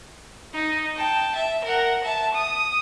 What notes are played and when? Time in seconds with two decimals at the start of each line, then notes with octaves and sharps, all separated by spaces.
0.54 D#4
0.96 G5 A5
1.36 E5
1.65 A#4 F#5
2.04 E5 A5
2.35 D#6